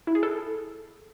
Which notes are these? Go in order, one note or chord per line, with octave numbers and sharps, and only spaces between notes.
E4
G#4
A4